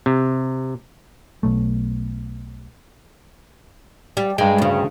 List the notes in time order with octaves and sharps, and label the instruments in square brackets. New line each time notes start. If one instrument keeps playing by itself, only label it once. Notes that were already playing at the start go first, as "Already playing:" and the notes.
[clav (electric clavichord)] C3
[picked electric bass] B1 A3
[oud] G3
[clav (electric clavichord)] G2 G5 [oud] G#3
[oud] D2 C#3